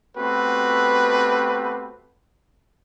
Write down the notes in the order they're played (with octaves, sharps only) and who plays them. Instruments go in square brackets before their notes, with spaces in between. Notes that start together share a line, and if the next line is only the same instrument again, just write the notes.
[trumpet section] A3 B3 C4 F#4 G4 B4